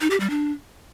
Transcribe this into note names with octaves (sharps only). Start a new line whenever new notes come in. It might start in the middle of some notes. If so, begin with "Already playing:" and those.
D#4
G4
G3
D4